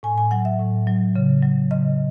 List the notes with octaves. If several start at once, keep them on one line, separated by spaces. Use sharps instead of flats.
A2 G#5
G#5
F#3 F#5
E5
A2
F#3
C#3
F#3
C#3 D#5